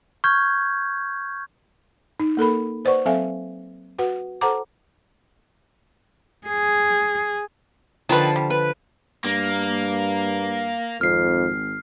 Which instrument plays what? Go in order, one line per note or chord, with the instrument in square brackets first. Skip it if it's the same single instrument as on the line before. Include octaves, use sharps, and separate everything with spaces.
[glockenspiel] C#6 F6 G6 G#6
[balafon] D#4
A#3 A4 A#4 B5
B4 C5 D5 F#5 C#6
F#3 C4 A4 E5 F5 G#5
F#4 B4 F#5
A4 C5 F#5 A5 A#5 D6
[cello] G#4
[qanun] D3 F3 A5 [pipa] D#3 C4 B4
[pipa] G3
[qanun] B4
[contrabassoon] G2 [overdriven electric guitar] A#3
[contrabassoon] G#1 [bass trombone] F2 [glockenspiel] F6 C7